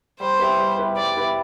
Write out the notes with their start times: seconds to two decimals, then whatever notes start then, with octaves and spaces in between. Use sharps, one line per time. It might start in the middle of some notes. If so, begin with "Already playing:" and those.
0.20 G3 C5
0.39 B3 E4 G4 B4
0.59 G3
0.78 B3 E4 G4 B4
0.97 G3 D5
1.16 B3 E4 G4 B4